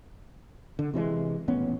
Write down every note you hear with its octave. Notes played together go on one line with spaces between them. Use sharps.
D3
C3 E3 F3 G#3
D#1 A1 B3 C#4